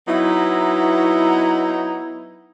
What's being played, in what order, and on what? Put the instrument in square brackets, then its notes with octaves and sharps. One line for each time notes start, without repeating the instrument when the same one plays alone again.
[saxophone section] F#3 B3 D#4 E4